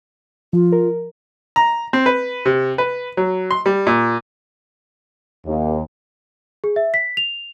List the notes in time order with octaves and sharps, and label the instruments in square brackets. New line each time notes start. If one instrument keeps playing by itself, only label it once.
[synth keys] F3 [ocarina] F4
[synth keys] A#4
[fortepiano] A#5
C4
B4
C3
B4
F#3
C6
G3
A#2
[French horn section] D#2
[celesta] G#4
E5
B6
F7